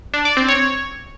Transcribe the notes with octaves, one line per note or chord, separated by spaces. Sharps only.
D4
D5
C4
C#5